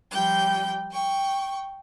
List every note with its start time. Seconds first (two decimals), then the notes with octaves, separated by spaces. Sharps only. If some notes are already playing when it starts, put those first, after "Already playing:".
0.11 F3 G3 G5 G6
0.90 G5 C#6